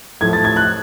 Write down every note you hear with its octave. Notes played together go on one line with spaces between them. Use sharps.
A2 F3 A3 G#6
A6
G#6
F#6